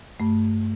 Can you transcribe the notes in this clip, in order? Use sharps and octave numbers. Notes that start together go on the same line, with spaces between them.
G2 A3